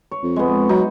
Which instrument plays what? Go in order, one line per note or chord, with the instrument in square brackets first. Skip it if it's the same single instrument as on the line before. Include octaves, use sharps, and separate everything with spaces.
[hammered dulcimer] C#5
[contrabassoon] F2
[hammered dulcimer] G#3 B3
[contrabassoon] F#3 [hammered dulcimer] D#4